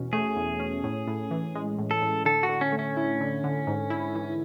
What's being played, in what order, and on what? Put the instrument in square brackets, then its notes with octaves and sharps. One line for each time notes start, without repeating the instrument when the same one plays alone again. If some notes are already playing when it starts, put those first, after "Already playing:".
Already playing: [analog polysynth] E2 B2 C#4
[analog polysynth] A3 [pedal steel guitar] G#4
[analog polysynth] E2
C#4
A2
A2
E3
G#3
A2
[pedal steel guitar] A4
[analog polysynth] A2
[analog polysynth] D3 [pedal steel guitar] A4
[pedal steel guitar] F#4
[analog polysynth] D3
[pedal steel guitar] C#4
[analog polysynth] A3
[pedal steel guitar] C#4
[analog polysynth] E4
D3
D3
G#2
E4
E3